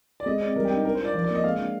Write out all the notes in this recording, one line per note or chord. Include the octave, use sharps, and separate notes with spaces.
D5
G#3 D#5
C4 D5
G3 A#4
G4
D4 D#4
D4 A#4
C5
F4 D5
F3 D5
D5
A#3
D#5
G#3 F5
D4